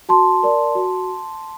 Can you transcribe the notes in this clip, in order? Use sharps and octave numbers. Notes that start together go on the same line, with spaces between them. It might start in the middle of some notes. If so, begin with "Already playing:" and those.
F#4 A5 C6
A#4 D5
F#4